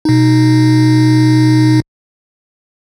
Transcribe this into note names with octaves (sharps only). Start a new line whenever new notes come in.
B2 D#4